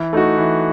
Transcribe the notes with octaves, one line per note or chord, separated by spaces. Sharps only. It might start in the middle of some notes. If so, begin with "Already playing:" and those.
Already playing: E3
A3 D#4 F#4
E3